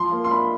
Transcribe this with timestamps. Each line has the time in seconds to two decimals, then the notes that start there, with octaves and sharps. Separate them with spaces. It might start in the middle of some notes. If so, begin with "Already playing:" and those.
Already playing: F3 C6
0.11 A#3
0.24 C6
0.30 D4 B5